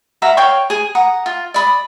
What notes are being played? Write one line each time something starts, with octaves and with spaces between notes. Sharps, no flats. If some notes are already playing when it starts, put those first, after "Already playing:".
F#4 E5 F5 A#5
C#5 F5 G5 C#6
G#4 G#5
F#5 A#5 D#6
F4
D5 B5 D#6